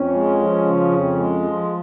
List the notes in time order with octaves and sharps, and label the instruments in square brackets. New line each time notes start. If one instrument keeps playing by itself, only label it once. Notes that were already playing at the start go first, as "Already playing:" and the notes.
Already playing: [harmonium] F2 [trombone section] C#4
[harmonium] G#3
F3
C#3
F2
G#3
F3